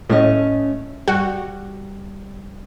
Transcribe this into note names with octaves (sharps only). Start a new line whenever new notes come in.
A2 A3 C#4 D#5
G3 F#4